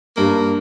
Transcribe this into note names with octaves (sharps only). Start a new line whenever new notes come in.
G2 A#3